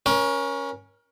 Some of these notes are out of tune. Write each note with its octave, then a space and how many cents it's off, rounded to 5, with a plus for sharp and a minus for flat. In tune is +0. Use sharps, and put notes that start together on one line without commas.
C#4 +0 A#4 +30